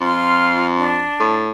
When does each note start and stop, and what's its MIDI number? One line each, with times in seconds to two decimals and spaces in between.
0.01 1.06 41
0.01 0.66 65
0.01 0.66 84
0.01 0.66 89
0.77 1.43 62
1.20 1.51 45